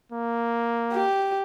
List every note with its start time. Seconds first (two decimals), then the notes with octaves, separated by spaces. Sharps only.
0.12 A#3
0.93 G4